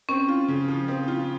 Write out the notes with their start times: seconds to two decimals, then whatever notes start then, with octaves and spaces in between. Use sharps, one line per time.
0.09 C4 C#4
0.28 F4
0.48 C#3
0.68 F3
0.88 C4
1.08 F4